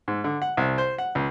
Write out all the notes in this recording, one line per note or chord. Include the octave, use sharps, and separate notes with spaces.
G#2
D3
F#5
C2
C5
F#5
C#2